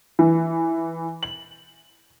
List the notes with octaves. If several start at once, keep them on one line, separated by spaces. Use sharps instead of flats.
E3
F#7